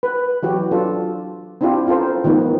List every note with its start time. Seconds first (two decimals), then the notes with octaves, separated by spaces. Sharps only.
0.03 B4
0.43 E3 F#3 F#4 G4
0.71 D4 F4 A4
1.61 C4 D4 E4 F4 G4
1.87 C#4 F4 A4 A#4 C5
2.24 D#3 F3 A3 B3